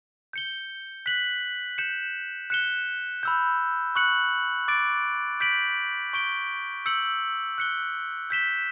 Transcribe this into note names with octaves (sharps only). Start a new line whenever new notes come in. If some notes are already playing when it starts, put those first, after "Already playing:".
G6 C#7 G7
F#6 B6 F#7
G6 C#7 E7
F#6 C#7 E7 G7
B5 E6 G6
C#6 F#6 C#7 F#7
D6 A6 D7
G6 B6 D7 F#7
C#6 G6 D7 G7
E6 G6 C#7 F#7
F#6 C#7 G7
G6 B6 E7 G7